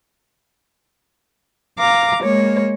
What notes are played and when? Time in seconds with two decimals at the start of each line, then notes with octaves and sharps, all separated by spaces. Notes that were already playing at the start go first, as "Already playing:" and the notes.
1.78 F5 A#5 D6
2.23 G#3 A#3 C#5